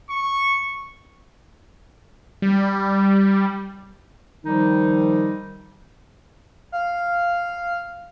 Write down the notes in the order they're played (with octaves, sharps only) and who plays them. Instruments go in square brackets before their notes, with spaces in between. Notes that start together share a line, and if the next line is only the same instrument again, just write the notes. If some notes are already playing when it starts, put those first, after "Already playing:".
[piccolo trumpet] C#6
[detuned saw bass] G3
[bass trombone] D#3 [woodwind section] F3 G3 D#4
[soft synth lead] F5